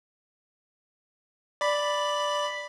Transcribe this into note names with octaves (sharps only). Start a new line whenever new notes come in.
D5 B5